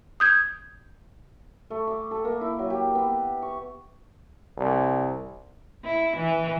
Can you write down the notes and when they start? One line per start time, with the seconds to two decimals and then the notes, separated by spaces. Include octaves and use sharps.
0.20 D#6 G6 G#6
1.70 A3
1.87 D6
2.11 A4
2.25 A#3
2.41 E4
2.59 F#3
2.70 G4
2.95 B3
3.42 C#6
4.57 C2
5.84 E4
6.17 E3